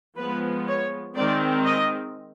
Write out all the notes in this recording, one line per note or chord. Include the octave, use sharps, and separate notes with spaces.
F3 G#3 B3 B4
C#5
D#3 G#3 C4 D5
D#5